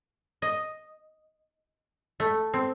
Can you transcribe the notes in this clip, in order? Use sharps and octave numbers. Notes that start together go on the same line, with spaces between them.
D#5
A3
C4